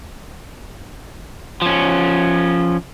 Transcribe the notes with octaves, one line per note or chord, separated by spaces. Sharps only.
F3 C#4